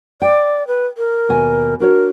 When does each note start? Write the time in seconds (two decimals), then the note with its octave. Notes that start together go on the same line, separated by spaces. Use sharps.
0.22 D5 G5
0.67 B4
0.98 A#4
1.29 D#2 B2 G#5
1.80 D4 F#4 A#4 C#5